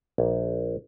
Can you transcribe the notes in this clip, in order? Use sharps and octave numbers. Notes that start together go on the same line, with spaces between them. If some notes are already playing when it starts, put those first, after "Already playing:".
A#1